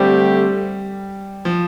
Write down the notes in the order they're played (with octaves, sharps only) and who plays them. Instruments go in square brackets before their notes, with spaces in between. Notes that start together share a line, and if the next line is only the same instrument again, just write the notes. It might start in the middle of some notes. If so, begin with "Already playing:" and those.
Already playing: [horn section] D3 A3 C4 G4 [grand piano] G3
[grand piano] F3